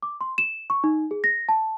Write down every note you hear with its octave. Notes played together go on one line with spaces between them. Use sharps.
D6
C6
E7
C#6
D#4
G#4
A#6
A5